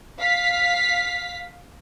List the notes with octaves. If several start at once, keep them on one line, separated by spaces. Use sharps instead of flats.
F5 B6